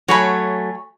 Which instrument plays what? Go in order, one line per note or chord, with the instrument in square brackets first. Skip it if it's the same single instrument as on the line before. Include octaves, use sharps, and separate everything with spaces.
[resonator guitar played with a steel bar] F#3 A3 [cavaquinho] C#5 G#5 B5